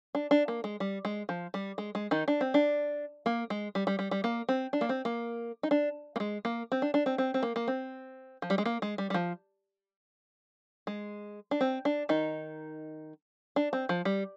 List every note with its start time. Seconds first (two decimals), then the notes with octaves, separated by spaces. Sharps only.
0.15 D4
0.31 D4
0.48 A#3
0.64 G#3
0.80 G3
1.05 G#3
1.29 F3
1.54 G3
1.78 G#3
1.95 G#3
2.11 D#3 D#4
2.28 D4
2.41 C4
2.54 D4
3.26 A#3
3.50 G#3
3.75 G3
3.87 G3
3.99 G3
4.11 G3
4.24 A#3
4.49 C4
4.73 D4
4.81 A#3
4.89 C4
5.05 A#3
5.63 D#4
5.71 D4
6.16 A#3
6.20 G#3
6.45 A#3
6.72 C4
6.82 D4
6.94 D4
7.06 C4
7.18 C4
7.34 C4
7.43 A#3
7.56 A#3
7.68 C4
8.42 F3
8.50 G3
8.58 G#3
8.65 A#3
8.82 G#3
8.98 G3
9.10 G3
9.14 F3
10.87 G#3
11.51 D4
11.61 C4
11.85 D4
12.09 D#3 D#4
13.56 D4
13.73 C4
13.89 F3
14.05 G3